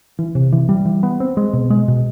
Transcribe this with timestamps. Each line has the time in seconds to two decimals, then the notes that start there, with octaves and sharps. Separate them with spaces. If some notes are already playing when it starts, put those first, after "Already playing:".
0.19 E3
0.35 C3
0.52 E3
0.69 G3
0.85 E3
1.03 B3
1.20 C4
1.37 G#3
1.53 B2
1.70 G#3
1.88 B2